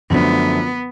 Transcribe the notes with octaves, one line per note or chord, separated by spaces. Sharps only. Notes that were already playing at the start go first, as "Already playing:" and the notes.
F#2 D3 F3 A3 B3 D4